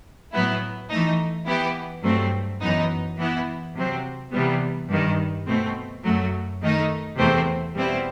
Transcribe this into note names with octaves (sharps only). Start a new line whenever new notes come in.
A2 F#3 B3 E4
E3 A3 D#4
E3 B3 E4 G4
G2 F#3 A3 C4
F#2 E3 B3 D#4
E3 B3 E4
C3 F#3 C4
C3 E3 G3 B3
G2 D#3 G3
B2 A3 C4
F#2 F#3 A3
D#3 A3 D#4
E2 C3 E3 A3 C4
B2 G3 C4 E4